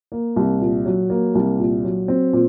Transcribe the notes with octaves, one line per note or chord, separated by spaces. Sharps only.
A#3
C2
A#2
F#3
A#3
C2
A#2
F#3
C4
A#2